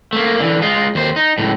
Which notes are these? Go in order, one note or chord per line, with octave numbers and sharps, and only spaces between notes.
A3 A#3
D3 E3
G#3 F4
D#2 C5
D#4
C#2 A2